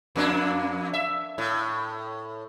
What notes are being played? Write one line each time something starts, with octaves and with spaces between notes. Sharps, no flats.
F2 A#3 D4
E5
A2